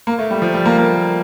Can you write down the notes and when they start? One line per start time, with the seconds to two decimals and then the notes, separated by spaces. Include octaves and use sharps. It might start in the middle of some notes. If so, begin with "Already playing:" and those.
0.07 A#3
0.19 A3
0.31 G3
0.42 F3
0.54 G3
0.66 A#3
0.77 A#3